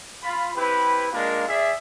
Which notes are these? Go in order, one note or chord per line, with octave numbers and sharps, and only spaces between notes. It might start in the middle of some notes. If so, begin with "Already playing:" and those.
F4 B5
C4 E4 G4 B4
G#3 A#3 D4 F4 A#4
G#4 D5 E5